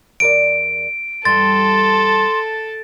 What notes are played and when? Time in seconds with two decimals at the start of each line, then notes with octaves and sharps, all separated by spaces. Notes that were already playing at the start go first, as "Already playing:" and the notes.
0.20 E2 A#4 D5 D7
1.25 G2 E3 G3 A4 A5 C6 A6